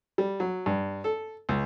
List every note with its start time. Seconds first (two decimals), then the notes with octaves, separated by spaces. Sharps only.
0.18 G3
0.40 F#3
0.66 G2
1.04 A4
1.49 C#2